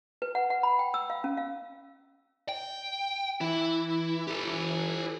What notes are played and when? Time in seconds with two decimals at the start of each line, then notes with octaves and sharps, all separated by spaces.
0.22 B4
0.35 F#5
0.50 F#5
0.63 B5
0.79 G5
0.94 E6
1.10 F5
1.24 C#4
1.37 F5
2.49 G5
3.41 E3 E4
4.27 G4 A4